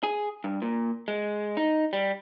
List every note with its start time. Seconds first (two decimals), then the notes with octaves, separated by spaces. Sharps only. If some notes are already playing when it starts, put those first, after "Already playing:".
0.03 G#4
0.44 G2
0.62 A#2
1.08 G#3
1.57 D#4
1.93 G3